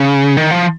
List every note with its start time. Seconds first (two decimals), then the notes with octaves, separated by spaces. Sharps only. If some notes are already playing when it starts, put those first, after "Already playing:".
Already playing: C#3
0.37 D#3
0.51 F3